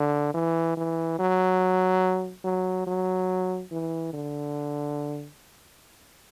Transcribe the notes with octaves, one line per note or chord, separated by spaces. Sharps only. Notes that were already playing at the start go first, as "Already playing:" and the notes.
Already playing: D3
E3
E3
F#3
F#3
F#3
E3
D3